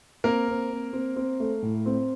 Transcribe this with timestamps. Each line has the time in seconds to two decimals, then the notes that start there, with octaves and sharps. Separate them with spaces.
0.24 A#3 C4 A#4
0.48 C4
0.70 C4
0.93 C4
1.16 C4
1.40 A3
1.62 A2
1.86 C4